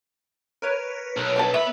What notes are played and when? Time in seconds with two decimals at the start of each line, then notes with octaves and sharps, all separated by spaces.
0.62 A#4 B4 C#5
1.16 B1
1.36 G3 D4 A5
1.54 B3 E5 B5